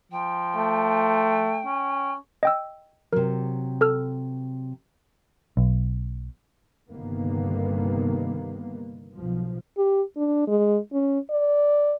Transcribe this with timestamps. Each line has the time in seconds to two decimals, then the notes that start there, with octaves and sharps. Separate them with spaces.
0.12 F3 G5
0.56 A3
1.65 C#4
2.43 D#5 G5 E6
3.13 C3 F#3 A#4
3.81 A4 E6 F6
5.57 B1
6.89 G1 G2 C3 D#3 A#3 B3
9.17 B1 F3
9.77 G4
10.16 D4
10.47 G#3
10.93 C#4
11.30 D5